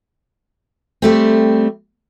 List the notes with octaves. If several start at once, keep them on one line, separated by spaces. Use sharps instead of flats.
G3 A3 C4